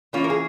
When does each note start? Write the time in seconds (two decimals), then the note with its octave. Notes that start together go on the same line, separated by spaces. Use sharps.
0.13 E3 A#3 C#4 F4
0.24 A#4
0.30 G#4